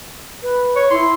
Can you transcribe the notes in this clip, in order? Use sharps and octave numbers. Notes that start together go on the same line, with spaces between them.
B4
C#5
E4 C6